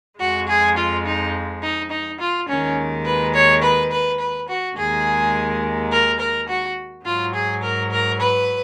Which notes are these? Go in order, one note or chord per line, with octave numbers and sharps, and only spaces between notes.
F2 F3 G#3 F#4
G#4
F4
D#4
D#4
D#4
F4
D#2 D#3 G#3 C#4
B4
C#5
B4
B4
B4
F#4
D#2 D#3 G#3 G#4
A#4
A#4
F#4
G#2 F#3 F4
G#4
A#4
A#4
B4